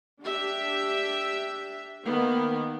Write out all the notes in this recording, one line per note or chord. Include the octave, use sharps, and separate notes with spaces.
D4 G4 E5
D#3 A#3 B3